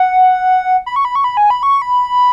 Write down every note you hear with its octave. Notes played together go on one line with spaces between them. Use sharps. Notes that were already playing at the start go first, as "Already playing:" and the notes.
Already playing: F#5
B5
C#6
B5
C#6
B5
G#5
B5
C#6
B5